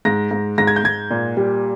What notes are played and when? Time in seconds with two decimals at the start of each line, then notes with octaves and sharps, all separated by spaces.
0.05 G#2 A#6
0.31 G#2
0.58 G#2 A#6
0.67 G#6
0.76 G6
0.84 G#2 G#6
1.11 A#2
1.37 G3